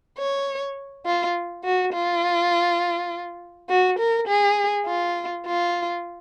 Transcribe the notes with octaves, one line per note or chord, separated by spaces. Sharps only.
C#5
F4
F#4
F4
F#4
A#4
G#4
F4
F4